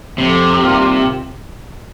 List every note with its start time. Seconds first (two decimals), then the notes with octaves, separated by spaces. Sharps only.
0.18 F2 C3
0.60 D#3 G3 A#3 F4